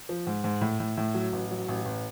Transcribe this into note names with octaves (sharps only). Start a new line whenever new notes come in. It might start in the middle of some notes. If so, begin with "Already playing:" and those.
F3
G#2
G#2
A2
A2
A2
F#3
A1
F#3
A1
A1